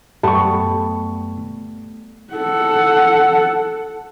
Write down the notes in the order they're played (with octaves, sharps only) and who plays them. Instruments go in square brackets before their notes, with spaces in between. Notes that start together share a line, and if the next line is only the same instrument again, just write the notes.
[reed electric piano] F#2 C#6 [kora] G3 A3 B3
[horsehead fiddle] A4 F#5